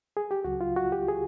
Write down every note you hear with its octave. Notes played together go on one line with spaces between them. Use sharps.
G#4
G4
C#2 C#3 F#3 F#4
F4
F#4
G4
G#4